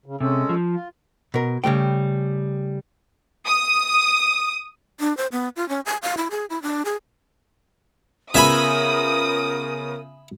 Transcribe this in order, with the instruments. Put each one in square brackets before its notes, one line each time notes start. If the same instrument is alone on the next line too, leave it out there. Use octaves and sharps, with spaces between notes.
[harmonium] C#3
[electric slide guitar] C3 [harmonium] G#3 C#4 A4
[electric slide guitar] F3
[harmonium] F4
[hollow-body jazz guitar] B2 A#4
C#3 G3 A3 G5
[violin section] D#6
[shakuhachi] D4
C5
B3
F4
C#4
G#5
F5
E4
G#4
E4
D4
G#4
[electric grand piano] C#3 B3 F4 [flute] A#4 [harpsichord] E5 G#5 B5 [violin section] D#6